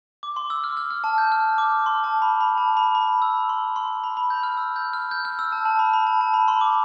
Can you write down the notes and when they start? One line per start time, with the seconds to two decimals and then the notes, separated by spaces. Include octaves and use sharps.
0.23 D6
0.36 C6
0.50 E6
0.64 F6
0.77 F6
0.90 F6
1.04 A5
1.18 G6
1.32 F6
1.58 D6
1.86 C6
2.04 A5
2.22 B5
2.41 B5
2.58 A5
2.77 B5
2.95 B5
3.22 E6
3.49 C6
3.76 C6
4.04 B5
4.17 B5
4.30 G6
4.43 F6
4.57 E6
4.76 G6
4.93 F6
5.11 G6
5.25 F6
5.39 E6
5.52 A5
5.65 A5
5.79 B5
5.93 B5
6.07 A5
6.21 A5
6.34 B5
6.48 C6
6.61 D6